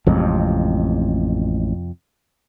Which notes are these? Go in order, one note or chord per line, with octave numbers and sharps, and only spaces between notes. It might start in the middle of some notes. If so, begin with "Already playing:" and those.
A1 F2 C3 G#3